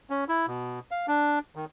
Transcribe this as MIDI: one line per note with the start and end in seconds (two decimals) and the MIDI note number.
0.10 0.24 61
0.28 0.46 64
0.47 0.79 47
0.91 1.06 77
1.08 1.39 62
1.55 1.65 51